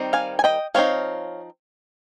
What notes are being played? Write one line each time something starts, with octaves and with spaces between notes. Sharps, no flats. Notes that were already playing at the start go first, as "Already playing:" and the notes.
Already playing: D#3 G3 C4 D#4
F5 G#5
G#5
D#5 G5
F3 C4 D#4 C#5 F5